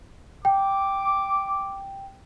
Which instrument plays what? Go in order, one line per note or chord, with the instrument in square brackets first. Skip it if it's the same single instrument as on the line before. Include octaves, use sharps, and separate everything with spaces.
[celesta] G5 [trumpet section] D6